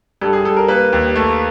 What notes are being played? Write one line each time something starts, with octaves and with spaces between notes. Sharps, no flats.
G2 A4
G#4
G2 A4
A#4
A#3 B4
D#2
A3